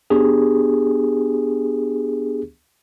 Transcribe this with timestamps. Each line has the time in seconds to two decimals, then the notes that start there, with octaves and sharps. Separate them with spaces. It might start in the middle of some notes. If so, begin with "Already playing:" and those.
0.10 B3 D4 G4 G#4